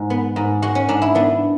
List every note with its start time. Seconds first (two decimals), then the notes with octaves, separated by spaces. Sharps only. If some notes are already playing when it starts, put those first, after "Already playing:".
Already playing: G#2 G#3
0.10 B3
0.36 G#2
0.62 G#3 F#4
0.75 C#4
0.88 G#2 D4
1.02 E4
1.15 B3 D4